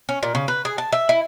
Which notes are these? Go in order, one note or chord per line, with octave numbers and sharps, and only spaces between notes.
C#4
A#2
C#3
B4
G#4
A5
E5
E4